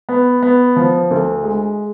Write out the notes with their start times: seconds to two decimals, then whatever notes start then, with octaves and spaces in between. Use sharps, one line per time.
0.09 B3
0.43 B3
0.76 F3
1.10 D2
1.43 G#3